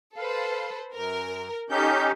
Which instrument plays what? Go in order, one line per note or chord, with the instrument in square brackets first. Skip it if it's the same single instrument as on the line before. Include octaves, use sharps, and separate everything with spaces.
[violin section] A4 B4 C5 [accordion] F5
[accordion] F#2 [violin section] A#4
[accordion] C#4 D#4 G4 [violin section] A4 G6